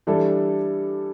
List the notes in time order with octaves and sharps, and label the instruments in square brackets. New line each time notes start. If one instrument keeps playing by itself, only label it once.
[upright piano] E3 G3 D4 A4